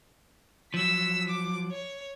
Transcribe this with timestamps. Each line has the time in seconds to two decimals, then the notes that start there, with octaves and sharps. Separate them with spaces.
0.74 F3 F#3 E6 B6
1.29 D6
1.72 C#5